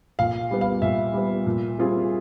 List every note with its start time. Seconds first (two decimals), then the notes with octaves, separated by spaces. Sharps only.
0.19 A#2 F5
0.51 G3 B3
0.61 F5
0.82 A#2 E5
1.14 G3 B3
1.46 A#2
1.78 G3 C4 F4 G#4